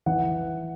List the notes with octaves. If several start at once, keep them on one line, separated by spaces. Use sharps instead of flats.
E3 F#5